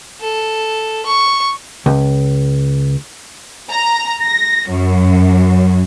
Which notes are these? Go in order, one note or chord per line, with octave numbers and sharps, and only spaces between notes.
A4
C#6
C#2
A#5
A#6
F#2